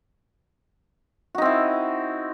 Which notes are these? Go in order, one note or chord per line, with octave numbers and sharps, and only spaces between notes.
C4 D#4 E4 F#4